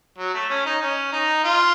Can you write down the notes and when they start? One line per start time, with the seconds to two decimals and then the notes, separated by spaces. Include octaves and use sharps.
0.18 F#3
0.34 A3
0.49 C#4
0.65 D#4
0.81 C#4
1.12 D#4
1.44 F4